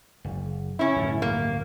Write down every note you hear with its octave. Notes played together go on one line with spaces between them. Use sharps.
F#1
C#4 E4
D1 G2
A#3